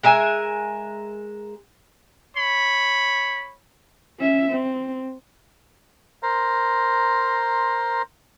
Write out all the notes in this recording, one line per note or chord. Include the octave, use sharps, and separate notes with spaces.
G#3 A#4 E5 G#5
C#5 B5
C#4 E5
C4
A#4 C5 A#5 C6